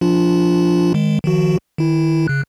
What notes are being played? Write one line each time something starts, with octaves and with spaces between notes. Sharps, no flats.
F3 D4 F4
D#3 G#3
D#3 F3 F#4
D#3 E4
C#3 F#6